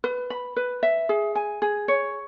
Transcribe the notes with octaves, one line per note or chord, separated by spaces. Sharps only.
B4
B5
B4
E5
G#4
G#5
G#4
C#5